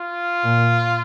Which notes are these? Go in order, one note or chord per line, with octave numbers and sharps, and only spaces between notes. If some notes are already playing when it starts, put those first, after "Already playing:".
Already playing: F4
A#2